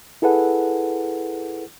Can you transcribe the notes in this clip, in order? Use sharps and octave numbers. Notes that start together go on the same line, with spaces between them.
E4 G#4 A4 B4 F#5